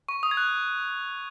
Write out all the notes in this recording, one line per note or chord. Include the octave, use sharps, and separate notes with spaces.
C#6
D#6
G#6
F#6